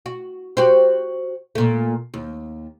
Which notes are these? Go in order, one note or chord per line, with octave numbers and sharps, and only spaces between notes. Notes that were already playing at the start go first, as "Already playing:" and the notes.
F#4
F#4 G4 C5
A#2 A3
D#2